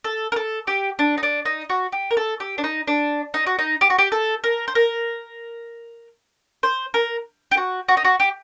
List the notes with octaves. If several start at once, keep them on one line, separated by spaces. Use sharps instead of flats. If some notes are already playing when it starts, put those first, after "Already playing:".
A4
A#4
A4
G4
D4
D#4
D4
D#4
F#4
G4
A#4
A4
G4
D4
D#4
D4
D#4
F#4
D#4
G4
F#4
G4
A4
A#4
C5
A#4
C5
A#4
G4
F#4
F#4
D#4
F#4
G4